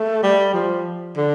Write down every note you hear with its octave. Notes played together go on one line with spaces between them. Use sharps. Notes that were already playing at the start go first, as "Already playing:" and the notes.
Already playing: A3
G3
F3
D3